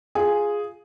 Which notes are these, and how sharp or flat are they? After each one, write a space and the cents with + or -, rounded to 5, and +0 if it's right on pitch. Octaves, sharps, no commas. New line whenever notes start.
F4 +0 G#4 +0